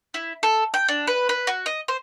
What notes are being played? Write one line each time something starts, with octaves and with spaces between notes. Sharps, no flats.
E4
A4
G5
D4
B4
B4
F#4
D#5
C5